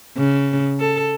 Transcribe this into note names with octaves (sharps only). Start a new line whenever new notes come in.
C#3
A4